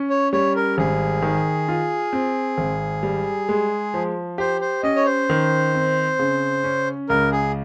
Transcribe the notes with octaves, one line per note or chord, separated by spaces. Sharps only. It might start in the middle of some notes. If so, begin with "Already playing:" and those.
Already playing: C#4
C#5
G3 C#5
A#4
G#1 G#4
D#3
F4
C4
G#1
G3
G#3
F3
G4 C5
C5
C#4 D#5
C#5
C5
D#3
C4
C#3
C#4
C#2 A#4
G#4